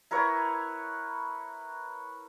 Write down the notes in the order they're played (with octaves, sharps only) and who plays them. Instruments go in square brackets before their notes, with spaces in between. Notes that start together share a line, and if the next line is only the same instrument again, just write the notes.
[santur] E4 A#4 B4 C#5